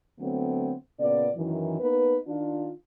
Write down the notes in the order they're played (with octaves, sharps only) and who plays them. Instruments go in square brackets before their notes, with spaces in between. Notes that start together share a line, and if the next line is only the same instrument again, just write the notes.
[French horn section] D3 F#3 A3 B3 C4
A#2 C#3 B3 D5
F#2 D#3 E3
A#3 B3 D#4 B4
D#3 D4 F4